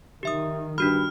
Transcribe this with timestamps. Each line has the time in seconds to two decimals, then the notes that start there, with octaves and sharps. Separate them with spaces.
0.23 D#3 G4 E5 D#6
0.78 G2 D4 F#4 B5 F6